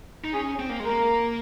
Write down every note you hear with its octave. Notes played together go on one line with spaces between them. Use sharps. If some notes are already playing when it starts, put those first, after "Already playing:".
D#4
C#4 G#4
C4
A#3
G#3
A#3 A#4